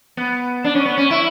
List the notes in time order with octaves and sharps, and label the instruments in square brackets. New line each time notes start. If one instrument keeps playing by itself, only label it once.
[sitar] B3
D4
C#4
B3
C#4
E4